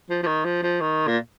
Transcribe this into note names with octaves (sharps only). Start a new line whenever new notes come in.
F3
F3
D#3
F3
F3
D#3
A#2